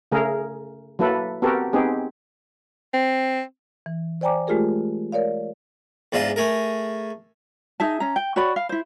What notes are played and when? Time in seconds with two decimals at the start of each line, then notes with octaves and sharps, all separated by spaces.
0.12 C#3 A3 G#4 A#4
0.99 F#3 A#3 E4 A4 B4
1.42 B3 C4 F#4 G4 A4 A#4
1.73 B3 C4 D#4 G4 G#4
2.94 C4
3.86 E3
4.21 C5 D5 G5 G#5 A#5 D6
4.47 G#3 A3 F4 G4 G#4 A#4
5.12 A#4 C#5 D5 F5
6.12 E2 G#2 D4 F4 D#5
6.36 A3 G#4 A#4
7.80 D#4 G#4 E5 A5
8.00 C#4 A#5
8.16 G5
8.36 F#4 C#5 D5 B5
8.56 F5
8.69 E4 C5